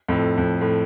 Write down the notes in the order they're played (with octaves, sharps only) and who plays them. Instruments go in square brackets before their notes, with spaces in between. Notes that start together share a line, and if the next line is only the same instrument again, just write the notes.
[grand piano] F2 A2
F2
A2